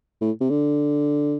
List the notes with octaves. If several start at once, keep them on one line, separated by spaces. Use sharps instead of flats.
A2
C3
D3